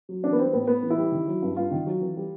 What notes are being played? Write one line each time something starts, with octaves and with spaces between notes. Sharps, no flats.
F#3
E3 D4
B3
G3 C4
A2 B3
A2 B3
E3
E4
G3
D#3
F#3
G2
G2 F4
D#3
F#3
E3
G3